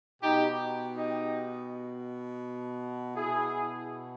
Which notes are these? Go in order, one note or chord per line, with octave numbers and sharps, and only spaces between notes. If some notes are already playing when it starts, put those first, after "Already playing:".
B2 D#4 G4
D#4 G4
B2 E4 G#4